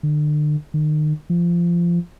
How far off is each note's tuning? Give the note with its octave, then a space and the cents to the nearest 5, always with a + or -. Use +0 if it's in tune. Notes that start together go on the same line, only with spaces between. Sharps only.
D3 +35
D#3 -35
F3 -20